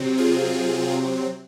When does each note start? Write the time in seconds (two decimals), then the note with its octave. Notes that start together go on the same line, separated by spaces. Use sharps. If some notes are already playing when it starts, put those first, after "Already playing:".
Already playing: C3 F#3 C4
0.17 F4 G#4